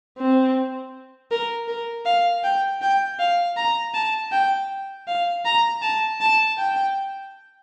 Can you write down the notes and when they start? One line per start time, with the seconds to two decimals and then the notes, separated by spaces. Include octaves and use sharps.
0.17 C4
1.31 A#4
1.68 A#4
2.06 F5
2.44 G5
2.82 G5
3.19 F5
3.57 A#5
3.94 A5
4.32 G5
5.08 F5
5.45 A#5
5.82 A5
6.21 A5
6.58 G5